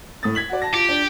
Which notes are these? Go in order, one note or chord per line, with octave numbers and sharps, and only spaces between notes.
A2 D#6 A6
G#6 B6 F#7
F#4 D5
A5 A#6
F4 G4
D4